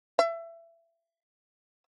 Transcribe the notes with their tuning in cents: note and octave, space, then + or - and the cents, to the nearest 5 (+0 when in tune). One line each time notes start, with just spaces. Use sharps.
E5 +25